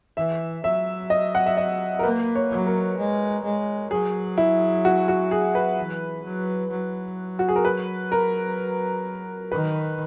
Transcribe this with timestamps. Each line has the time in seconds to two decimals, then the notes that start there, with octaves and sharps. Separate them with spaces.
0.17 E3 E5
0.64 F#3 E5
1.10 D#5
1.35 F#5
1.46 E5
1.57 D#5
1.99 A#4
2.03 A#3 B4
2.35 C#5
2.51 F#3
2.67 A#4
2.98 G#3
3.44 G#3
3.91 F#3 G#4
4.38 E4
4.85 F#4
5.08 F#4
5.31 G#4
5.55 B4
5.78 E3
6.24 F#3
6.71 F#3
7.39 F#4
7.48 G#4
7.56 A#4
7.65 B4
8.12 A#4
9.52 D#3 B4